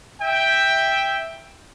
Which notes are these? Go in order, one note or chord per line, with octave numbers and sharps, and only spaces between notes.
E5 G5